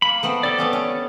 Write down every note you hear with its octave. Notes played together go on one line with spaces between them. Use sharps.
A#3 B5
A3 B3 C4
G4 A4 D5
A3 B3 C#4
C#4